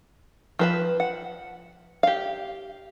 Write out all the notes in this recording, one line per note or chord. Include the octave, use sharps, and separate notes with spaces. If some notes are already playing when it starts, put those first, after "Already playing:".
F3 B4 A5
F#5
G4 F5